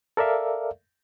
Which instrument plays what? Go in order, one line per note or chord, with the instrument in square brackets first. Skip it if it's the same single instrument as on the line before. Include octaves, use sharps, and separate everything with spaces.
[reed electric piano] A4 A#4 D5 E5 F5